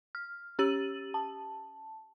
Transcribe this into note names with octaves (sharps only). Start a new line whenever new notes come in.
F6
C#4 G4 E6 A6 D#7 F#7
A5